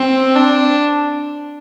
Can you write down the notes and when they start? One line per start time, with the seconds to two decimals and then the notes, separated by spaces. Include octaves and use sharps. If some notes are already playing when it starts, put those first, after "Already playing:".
Already playing: C4
0.35 D4